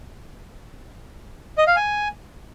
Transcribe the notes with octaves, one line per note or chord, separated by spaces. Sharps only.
D#5
F5
G#5